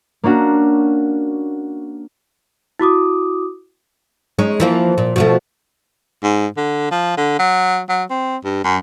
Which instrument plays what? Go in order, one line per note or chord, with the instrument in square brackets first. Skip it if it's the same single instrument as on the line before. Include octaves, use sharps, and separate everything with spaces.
[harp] A#3 C#4 D4 F#4
[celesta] E4 F#4 D6 D#6
[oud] G#3 C#4 D#4
E3 F3 A#3
A#2
B2 F3 A3
[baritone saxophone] G#2
D3
F3
D3
F#3
F#3
C4
G2
F#2